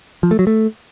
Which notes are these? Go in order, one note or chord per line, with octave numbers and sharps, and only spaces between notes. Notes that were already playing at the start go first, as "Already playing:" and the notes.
F3
A3
F#3
A3